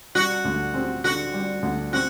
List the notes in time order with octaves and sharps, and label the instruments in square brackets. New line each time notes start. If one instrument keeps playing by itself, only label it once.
[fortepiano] G3 [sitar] F#4
[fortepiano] D2
C4
[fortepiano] D3 [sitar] F#4
[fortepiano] G3
D2
[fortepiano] C4 [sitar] F#4